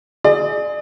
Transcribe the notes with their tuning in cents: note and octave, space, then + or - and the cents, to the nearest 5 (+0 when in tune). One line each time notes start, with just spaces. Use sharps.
G#4 +20 D5 +35